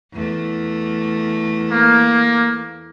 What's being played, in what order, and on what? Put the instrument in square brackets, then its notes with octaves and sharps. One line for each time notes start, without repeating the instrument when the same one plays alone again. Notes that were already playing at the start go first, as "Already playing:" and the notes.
[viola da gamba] E2 A3
[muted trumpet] A#3